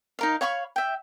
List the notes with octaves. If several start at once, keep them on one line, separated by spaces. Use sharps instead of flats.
D#4 A#4 F5
C#5 F5 B5 C#6
E5 G5